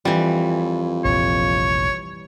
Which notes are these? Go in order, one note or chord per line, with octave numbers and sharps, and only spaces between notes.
F2 E3 G3
F1 A#1 C#5